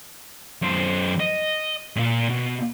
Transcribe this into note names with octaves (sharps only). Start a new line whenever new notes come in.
F#2 C5
D#5
A#2 A#3
B2